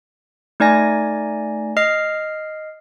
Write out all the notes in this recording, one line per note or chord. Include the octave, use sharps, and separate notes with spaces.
A3 D#4 D5 G#5 A#6
D#5 F6 C7